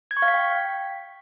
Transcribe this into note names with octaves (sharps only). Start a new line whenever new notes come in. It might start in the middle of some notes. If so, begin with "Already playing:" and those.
G#6
C#6
F5
B6
G5